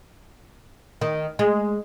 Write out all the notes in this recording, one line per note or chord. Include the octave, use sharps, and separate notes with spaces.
D#3
G#3